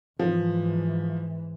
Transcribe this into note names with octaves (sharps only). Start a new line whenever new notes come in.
G#2 E3 F3